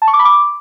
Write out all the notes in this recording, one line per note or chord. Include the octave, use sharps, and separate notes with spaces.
A5
C#6
D6
B5
D6